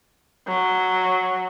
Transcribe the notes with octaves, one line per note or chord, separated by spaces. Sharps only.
F#3